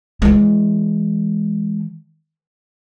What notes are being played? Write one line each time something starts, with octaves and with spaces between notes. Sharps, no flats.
E3 G#3